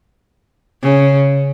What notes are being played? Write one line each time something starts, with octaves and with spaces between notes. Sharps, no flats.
C#3